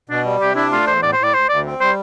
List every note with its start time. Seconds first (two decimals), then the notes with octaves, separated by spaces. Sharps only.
0.09 B2 D4
0.25 G3
0.40 C3 G4
0.56 D4 E4
0.72 A3 F4
0.87 E2 C5
1.02 A2 D5
1.13 C5
1.19 A2 D5
1.34 D2 C5
1.49 D2 D5
1.66 C4
1.81 G3 C5